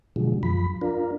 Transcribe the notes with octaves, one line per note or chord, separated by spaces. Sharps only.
B2 D3 F3 F#3 G#3
F#2 F3 B5
D4 F4 A#4